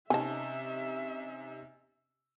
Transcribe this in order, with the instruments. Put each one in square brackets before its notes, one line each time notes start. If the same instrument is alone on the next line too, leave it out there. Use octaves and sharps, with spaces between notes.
[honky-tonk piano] C3 C#4 D#4 [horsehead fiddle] E5 [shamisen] G#5 A5